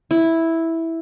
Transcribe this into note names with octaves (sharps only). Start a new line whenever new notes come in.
E4